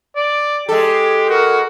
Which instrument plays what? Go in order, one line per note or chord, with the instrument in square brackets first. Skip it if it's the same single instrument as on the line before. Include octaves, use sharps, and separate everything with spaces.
[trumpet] D5
[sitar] G#3 A4 [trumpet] G4
[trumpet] F#4 [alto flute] A#4